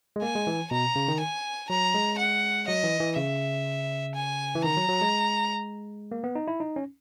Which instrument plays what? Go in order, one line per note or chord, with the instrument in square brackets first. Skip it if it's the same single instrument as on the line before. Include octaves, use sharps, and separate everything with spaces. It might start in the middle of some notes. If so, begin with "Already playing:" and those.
[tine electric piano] G#3
[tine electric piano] A#3 [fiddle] G#5
[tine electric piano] G#3
E3
[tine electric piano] B2 [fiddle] A#5
[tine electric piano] C#3
D#3
[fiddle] G#5
[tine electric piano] F#3 [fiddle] A#5
[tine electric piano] G#3
[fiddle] F#5
[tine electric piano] F#3 [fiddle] D#5
[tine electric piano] E3
E3
[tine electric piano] C#3 [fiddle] E5
[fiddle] G#5
[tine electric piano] E3
[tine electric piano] D#3 [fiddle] A#5
[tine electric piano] F#3
F#3
G#3
A#3
B3
D#4
E4
D#4
C#4